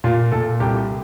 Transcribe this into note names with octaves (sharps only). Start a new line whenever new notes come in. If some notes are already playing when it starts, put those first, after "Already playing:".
A#2 F4
A#2 A4
C2 G4